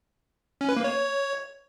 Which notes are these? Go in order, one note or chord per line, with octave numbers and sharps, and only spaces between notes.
C#4
B4
A#3
C#5